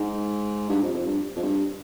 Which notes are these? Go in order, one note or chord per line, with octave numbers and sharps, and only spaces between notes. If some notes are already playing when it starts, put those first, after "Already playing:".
Already playing: G#2
G2
F2
F2
G2
F2
G2